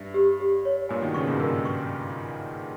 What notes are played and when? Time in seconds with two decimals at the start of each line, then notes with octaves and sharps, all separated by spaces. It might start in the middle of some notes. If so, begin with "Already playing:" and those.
Already playing: G2 E5
0.14 G4
0.40 G4
0.65 C#5
0.89 G2 A#2 G#5
1.02 B2 D#3
1.14 A#2 C#3 C#6
1.27 G#2 B2
1.40 G2 A#2 A#4
1.65 C#6